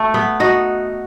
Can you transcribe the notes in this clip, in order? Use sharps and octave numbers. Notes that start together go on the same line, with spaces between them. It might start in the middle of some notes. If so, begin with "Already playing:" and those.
Already playing: A3
B3
D#4 F#4